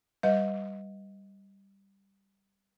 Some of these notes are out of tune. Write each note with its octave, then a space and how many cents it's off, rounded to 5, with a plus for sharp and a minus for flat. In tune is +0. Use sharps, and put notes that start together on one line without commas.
G3 +0 B4 +0 D#5 +20